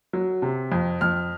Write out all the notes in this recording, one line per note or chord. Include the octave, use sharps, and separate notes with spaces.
F#3
C3
F2
F2 F6